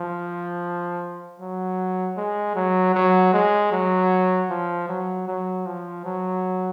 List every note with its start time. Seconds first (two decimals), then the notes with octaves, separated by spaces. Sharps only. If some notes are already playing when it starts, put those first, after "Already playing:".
Already playing: F3
1.40 F#3
2.17 G#3
2.56 F#3
2.95 F#3
3.34 G#3
3.72 F#3
4.50 F3
4.89 F#3
5.28 F#3
5.66 F3
6.05 F#3